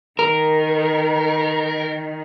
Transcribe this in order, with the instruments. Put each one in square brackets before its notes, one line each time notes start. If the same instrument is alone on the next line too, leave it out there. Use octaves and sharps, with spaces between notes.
[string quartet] D#3 [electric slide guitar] A#4